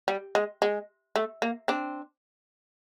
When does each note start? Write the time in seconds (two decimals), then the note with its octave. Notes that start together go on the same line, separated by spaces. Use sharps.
0.08 G3
0.35 G#3
0.62 G#3
1.16 A3
1.42 A#3
1.68 C4 D4